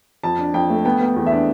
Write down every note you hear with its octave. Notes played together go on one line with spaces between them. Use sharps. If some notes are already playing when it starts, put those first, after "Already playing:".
F2 A5
D4
F2 G5
A3
B3 G5
B3
G5
E2
E5
D4